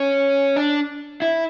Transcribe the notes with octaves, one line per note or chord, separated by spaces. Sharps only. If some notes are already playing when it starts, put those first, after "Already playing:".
Already playing: C#4
D4
E4